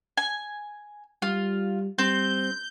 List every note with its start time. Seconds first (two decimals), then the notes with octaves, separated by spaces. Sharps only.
0.17 G#5
1.22 G3 F4
1.98 G3 C4 G6